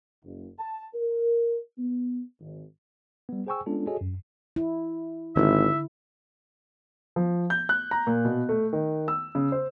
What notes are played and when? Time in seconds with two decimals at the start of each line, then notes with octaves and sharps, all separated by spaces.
0.24 F#1
0.59 A5
0.94 A#4
1.78 B3
2.41 G#1
3.29 G3 B3
3.47 G#4 C5 G5 G#5 C#6 E6
3.66 G#3 B3 C#4 D4 F4 A4
3.87 F#4 G#4 A4 C#5 D#5 G#5
4.01 F#2
4.56 E4
5.36 G#1 D3 E4 E5
7.16 F3
7.50 G6
7.69 F#6
7.91 A#5
8.07 A#2
8.25 B2
8.49 A3
8.73 D#3
9.08 E6
9.35 C#3
9.52 C5